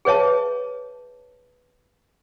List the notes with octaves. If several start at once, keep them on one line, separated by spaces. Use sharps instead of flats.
G#4 B4 C#5 E5 A5